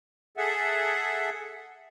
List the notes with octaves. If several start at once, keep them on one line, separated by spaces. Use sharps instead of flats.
G#4 A4 E5 F#5